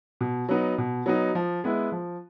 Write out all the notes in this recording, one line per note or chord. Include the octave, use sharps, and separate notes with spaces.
B2
F#3 B3 D#4
B2
F#3 B3 D#4
F3
G#3 B3 E4
F3